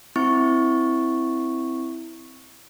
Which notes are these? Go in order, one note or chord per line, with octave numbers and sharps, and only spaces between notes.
C4 E4 C#6